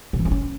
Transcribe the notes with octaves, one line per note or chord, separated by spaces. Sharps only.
D3
E3
C4
C#4